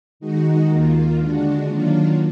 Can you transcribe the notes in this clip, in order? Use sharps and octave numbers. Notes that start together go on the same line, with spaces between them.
D#3 G#3 D#4 F#4
D#2 D#3 A#3 F4
D3 G#3 D4 F#4
D#3 F#3 A#3 D4 F4